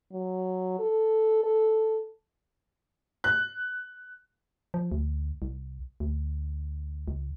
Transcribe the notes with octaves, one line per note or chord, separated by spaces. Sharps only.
F#3
A4
A4
F#6
F3
D2
C2
D2
C#2